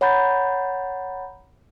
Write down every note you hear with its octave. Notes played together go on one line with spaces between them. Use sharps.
C#5 F#5 A#5 B5 G6 A6